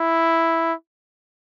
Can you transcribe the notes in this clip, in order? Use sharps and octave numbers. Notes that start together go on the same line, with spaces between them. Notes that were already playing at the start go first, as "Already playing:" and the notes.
Already playing: E4